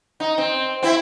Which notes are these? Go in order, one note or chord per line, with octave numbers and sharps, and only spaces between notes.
D#4
C4
C4 E4